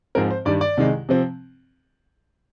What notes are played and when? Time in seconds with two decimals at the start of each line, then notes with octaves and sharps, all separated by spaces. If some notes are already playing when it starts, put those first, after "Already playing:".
0.15 G#2 F3 G#3 C4 A#4
0.31 C5
0.45 G2 D#3 G3 D5
0.61 D5
0.77 C2 C3 D#3 G#3
1.09 C3 F3 C4